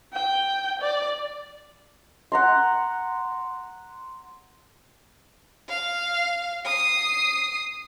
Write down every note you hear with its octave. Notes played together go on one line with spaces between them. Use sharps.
G5
D5
F#5 A#5 C6
F5
D#6 C7